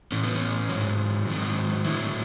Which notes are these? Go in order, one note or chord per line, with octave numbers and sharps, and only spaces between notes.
A2 E3 C#4
B3
C#4
G#2 F#3
G#2 D#3 F#3
A2 F#3 E4